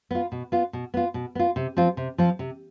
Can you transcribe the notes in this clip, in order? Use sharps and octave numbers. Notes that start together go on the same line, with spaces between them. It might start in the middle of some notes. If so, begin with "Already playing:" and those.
B3 F4
B2
B3 F4
B2
B3 F4
B2
B3 F4
C3
F3 C4 F4
C3
F3 C4 F4
C3